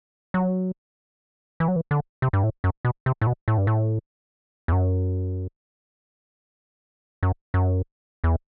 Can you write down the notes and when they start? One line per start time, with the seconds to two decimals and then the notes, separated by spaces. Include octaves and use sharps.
0.34 F#3
1.60 E3
1.68 F#3
1.76 E3
1.91 D3
2.22 C3
2.33 G2
2.44 A2
2.64 F#2
2.85 B2
3.06 C3
3.21 A2
3.27 B2
3.48 A2
3.58 G2
3.67 A2
4.68 E2
4.72 F#2
7.23 F#2
7.54 F#2
8.24 E2